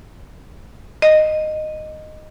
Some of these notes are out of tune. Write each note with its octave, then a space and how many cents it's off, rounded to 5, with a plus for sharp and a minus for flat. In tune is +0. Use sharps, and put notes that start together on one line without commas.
D#5 -10